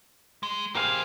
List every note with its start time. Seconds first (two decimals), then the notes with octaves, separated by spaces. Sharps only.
0.43 G#3
0.75 A#3 G4 G#4 C5 F5